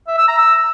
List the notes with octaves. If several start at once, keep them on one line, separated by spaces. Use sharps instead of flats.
E5
E6
A#5
E6